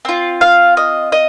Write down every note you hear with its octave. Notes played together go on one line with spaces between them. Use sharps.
C4 F4
F5
D#5
D#5